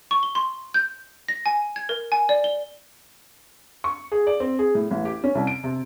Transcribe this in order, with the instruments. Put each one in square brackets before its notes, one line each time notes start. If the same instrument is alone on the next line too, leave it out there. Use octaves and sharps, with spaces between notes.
[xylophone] C#6
G7
C6
G6
A#6
G#5
G#6
A#4
G#5
D5
G7
[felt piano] C#6
G#4
D5
C4
G#4
A2
A1
G4
C#4
C2
D7
C3